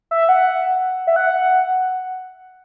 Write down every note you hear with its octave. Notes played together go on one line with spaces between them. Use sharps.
E5
F#5
E5
F#5